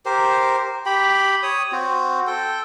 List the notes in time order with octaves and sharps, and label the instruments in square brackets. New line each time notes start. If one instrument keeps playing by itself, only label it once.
[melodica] G4 A#4 C5
G4 G5 B5
C#5 D#6
C4 F#4
A4 G5